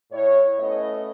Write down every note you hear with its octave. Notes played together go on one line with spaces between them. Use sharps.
A2 E4 C#5
A3 B3 C#4 E4 D#5